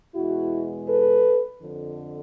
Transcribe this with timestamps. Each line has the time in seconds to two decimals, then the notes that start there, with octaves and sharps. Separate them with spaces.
0.14 E2 B2 G#3 E4 F#4
0.87 A4 B4
1.62 F2 D3 F3